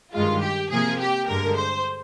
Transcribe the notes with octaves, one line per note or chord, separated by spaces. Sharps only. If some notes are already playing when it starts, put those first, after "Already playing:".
G2 D#3 G#3 F4
G4
C3 F3 A#3 G#4
G4
G2 D3 G#3 A#4
C5